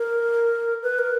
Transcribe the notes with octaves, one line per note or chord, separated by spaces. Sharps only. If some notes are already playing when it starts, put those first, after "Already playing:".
Already playing: A#4
B4
A#4